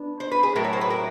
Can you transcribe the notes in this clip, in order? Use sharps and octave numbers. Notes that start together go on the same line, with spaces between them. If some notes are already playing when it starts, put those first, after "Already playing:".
Already playing: B3 D4
C5
B4
G#4
A2 F#3 A3 A#4
C#5
C5
B4
A#4